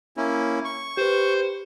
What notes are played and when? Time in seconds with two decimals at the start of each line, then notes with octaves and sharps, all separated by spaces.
0.17 A#3 C#4 E4
0.65 C#6
0.97 G4 B4 C5